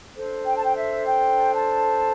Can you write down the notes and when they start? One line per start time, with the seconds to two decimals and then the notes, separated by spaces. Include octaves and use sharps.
0.13 D4 A4 C5
0.44 G5
0.55 A5
0.64 G5
0.74 E5
1.06 G5
1.52 A5